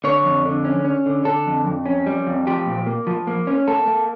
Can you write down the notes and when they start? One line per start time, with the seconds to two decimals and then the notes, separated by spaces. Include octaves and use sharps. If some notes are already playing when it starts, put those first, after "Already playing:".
0.04 D3 C#5
0.25 F2
0.45 D3
0.65 C#4
0.85 C#4
1.06 D3
1.25 D3 A4
1.46 F2
1.67 F2
1.86 C#4
2.06 G3
2.27 F2
2.47 F3 G4
2.67 A#2
2.87 A#3
3.07 F3
3.27 A#3
3.47 C#4
3.67 A#3 A4
3.88 A#3